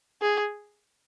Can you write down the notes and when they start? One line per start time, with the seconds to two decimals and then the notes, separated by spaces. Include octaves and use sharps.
0.22 G#4